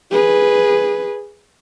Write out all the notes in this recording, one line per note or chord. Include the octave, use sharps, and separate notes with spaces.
G#4 B4